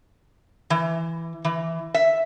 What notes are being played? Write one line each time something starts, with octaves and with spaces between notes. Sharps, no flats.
E3
E3
E5